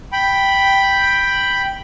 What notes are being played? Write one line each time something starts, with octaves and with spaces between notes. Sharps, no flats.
G5 B5